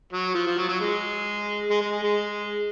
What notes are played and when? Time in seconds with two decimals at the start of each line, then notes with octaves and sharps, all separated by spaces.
0.13 F#3
0.35 F3
0.47 F3
0.58 F#3
0.69 F#3
0.80 G#3
1.70 G#3
1.81 G#3
1.92 G#3
2.03 G#3